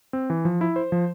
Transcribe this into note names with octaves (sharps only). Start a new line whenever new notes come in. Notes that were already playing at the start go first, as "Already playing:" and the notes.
C4
E3
F3
E4
C5
F3